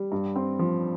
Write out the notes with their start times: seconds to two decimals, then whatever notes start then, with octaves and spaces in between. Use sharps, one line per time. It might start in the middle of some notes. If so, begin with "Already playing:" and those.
Already playing: G3
0.12 G2
0.36 C4
0.59 F3